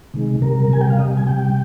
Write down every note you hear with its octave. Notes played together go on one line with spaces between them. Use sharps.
C3 D#3 G#3
C3 G3 A#4
C3 G3 G#5
G5
F5
C3 G3 D#5
G#5
C3 G3 G5